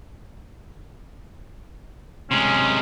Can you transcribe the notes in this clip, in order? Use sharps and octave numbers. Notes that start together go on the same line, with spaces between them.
C3 G#3 C#4